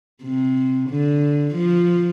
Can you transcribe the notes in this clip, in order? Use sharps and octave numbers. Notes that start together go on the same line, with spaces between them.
C3
D3
F3